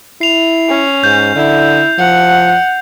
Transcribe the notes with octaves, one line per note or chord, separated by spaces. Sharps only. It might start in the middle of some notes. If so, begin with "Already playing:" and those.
E4 C7 F7
C#4
G#2 G6
D3 E4
F3 F#5